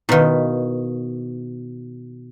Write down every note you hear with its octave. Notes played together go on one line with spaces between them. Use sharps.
B2 D#3 E4 B4 F5